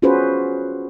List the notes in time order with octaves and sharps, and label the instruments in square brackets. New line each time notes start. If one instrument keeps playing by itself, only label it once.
[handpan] C#4 F4 F#4 G#4 B4 C5